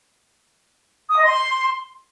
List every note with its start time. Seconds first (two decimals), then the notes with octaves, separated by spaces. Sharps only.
1.10 D#6
1.17 D#5
1.25 C6